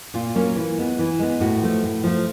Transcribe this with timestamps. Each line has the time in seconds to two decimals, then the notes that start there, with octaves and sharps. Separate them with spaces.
0.14 A#2 F4
0.35 F#3 A#3 C#4
0.56 E3
0.78 G#3 B3
0.99 E3
1.19 G#3 B3
1.40 A2 F#4
1.62 F3 A3
1.84 A2
2.04 F3 A3